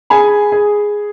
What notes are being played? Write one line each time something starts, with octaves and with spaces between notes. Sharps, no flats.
G#4 G#5 B5
G#4